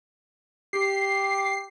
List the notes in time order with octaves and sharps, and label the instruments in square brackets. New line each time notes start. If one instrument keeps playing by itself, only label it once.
[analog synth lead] G4 [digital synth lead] C7